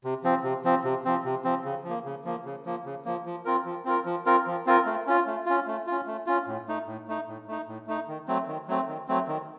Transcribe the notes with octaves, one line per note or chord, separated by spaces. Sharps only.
C3
F3 C4
C3
F3 C4
C3
F3 C4
C3
F3 C4
C#3
F3
A#3
C#3
F3 A#3
C#3
F3 A#3
C#3
F3 A#3
F3
C4 F4 A#4
F3
C4 F4 A#4
F3
C4 F4 A#4
F3
C4 F4 A#4
A3
C#4 F4
A3
C#4 F4
A3
C#4 F4
A3
C#4 F4
A2
A3 D#4
A2
A3 D#4
A2
A3 D#4
A2
A3 D#4
D#3
F#3 A3 C4
D#3
F#3 A3 C4
D#3
F#3 A3 C4
D#3